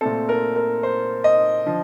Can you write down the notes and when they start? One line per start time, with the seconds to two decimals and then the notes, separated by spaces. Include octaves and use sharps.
0.01 A#2 A3 C4 A4
0.29 A#4
0.56 A#4
0.83 C5
1.24 D#5
1.66 D3 F3